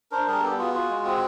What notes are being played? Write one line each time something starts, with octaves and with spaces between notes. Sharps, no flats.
D4 A#4 C5
G3 G#4 A#4
B3 G4 A4
F4 F#4 G#4
F4
G#3
C4